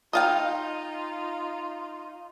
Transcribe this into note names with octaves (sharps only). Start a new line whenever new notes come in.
D#4 F4 D#5 F5 G5